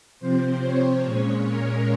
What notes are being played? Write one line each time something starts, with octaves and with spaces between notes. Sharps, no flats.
C3 F3 C4 C5
C#5
A#2 G#3 C#4 C#5
A#4